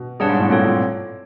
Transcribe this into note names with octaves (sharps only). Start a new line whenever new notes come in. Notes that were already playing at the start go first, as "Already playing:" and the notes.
Already playing: B2
G2 G#4 C#5 F#5 A5
G#2
A2
A#2 C4 F4 A4 C#5
A#2